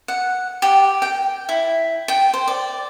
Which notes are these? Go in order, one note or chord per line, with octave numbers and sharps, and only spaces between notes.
F#5
G4
G5
E4
G5
C5
D5